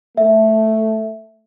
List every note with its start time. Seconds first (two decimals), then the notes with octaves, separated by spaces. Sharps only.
0.17 A3 E5